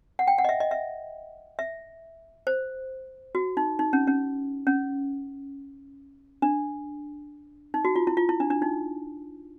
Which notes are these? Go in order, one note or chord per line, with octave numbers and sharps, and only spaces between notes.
F#5
G5
F#5
D#5
E5
D#5
E5
E5
C5
F#4
D#4
D#4
C#4
C#4
C#4
D4
D#4
F#4
F4
E4
F4
E4
D4
D4
D#4